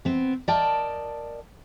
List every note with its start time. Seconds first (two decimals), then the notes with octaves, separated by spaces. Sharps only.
0.05 B3 C4
0.48 A#4 D5 D#5 G5 A5